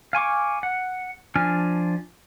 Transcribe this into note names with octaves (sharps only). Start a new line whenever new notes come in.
F5 G#5 C#6 D6
F#5
F3 D4 G#5 F6